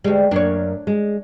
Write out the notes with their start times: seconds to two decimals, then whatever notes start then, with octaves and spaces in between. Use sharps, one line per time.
0.04 D2 G3 G#3
0.31 F#2 A#3 D4 C#5
0.87 G#3